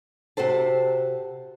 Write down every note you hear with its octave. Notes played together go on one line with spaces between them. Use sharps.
C3 F#4 A4 C5 A5